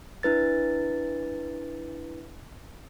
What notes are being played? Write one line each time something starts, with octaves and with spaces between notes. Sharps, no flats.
D4 E4 B4 A6